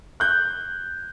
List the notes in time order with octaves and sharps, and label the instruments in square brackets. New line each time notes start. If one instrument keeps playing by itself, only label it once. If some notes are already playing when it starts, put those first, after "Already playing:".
[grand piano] F#6 G6